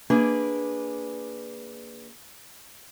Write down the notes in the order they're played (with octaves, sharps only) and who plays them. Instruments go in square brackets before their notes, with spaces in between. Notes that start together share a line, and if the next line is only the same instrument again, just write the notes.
[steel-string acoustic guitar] A#3 D4 G#4 B4